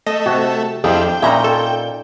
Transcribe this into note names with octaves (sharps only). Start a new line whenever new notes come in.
A3 D#5
C3 F#4
F2 F3 D4 E4 G4 G#4 C5
G5
A#2 C#4 D#4 E5 A#5 B5
A4